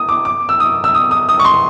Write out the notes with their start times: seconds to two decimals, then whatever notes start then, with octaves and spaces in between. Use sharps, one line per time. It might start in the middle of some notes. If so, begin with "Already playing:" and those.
Already playing: D#6
0.09 D6
0.25 D6
0.49 E6
0.60 D#6
0.84 E6
0.94 D#6
1.11 D#6
1.29 D#6
1.39 C#6
1.45 C6